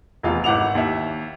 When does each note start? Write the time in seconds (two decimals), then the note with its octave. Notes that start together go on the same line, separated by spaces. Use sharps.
0.23 F1 E2 F4 F5
0.44 G#1 E4 F#5 D6 F7
0.75 D#2 E5